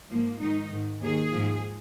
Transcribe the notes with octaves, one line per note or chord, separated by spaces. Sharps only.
G#2 F3 A#3
G#2 D#3 D#4
G#2 D#3
D#2 D#3 G#4
G#2 F3